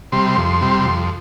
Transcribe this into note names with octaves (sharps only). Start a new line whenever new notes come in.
C3 G3 C6
F2
C3 G3
F2